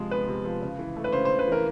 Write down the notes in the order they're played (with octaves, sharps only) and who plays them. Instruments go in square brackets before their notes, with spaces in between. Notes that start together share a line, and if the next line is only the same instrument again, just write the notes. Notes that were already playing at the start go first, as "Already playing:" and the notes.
Already playing: [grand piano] C3 F3 G#3
[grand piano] B3 [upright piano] B4
[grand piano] C3
F3
C#3
E3
A3
[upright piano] B4
[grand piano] C#3 [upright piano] C5
[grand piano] C#3 [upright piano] C5
[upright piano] B4
[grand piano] E3 [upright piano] A#4